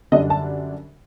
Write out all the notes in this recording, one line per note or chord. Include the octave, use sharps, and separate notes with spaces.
F#2 D3 G3 D4 D#5
A5